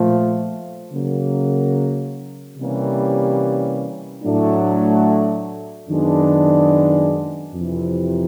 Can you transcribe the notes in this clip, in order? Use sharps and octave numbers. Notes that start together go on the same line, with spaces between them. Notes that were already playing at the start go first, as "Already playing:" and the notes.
Already playing: A#2 F3 A3
C#3 F#3 A#3
C3 E3 G3 A#3 C#4
A2 F#3 A3 D4
F#2 D#3 G#3 B3 D4
F2 C3 E3